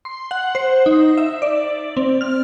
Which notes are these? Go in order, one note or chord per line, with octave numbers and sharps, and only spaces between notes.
C6
F#5
C5
D#4
E5
D5
C4
F6